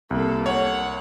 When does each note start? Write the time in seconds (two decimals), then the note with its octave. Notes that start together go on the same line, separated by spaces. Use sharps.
0.11 C2 A#3 A4
0.46 C#5 F#5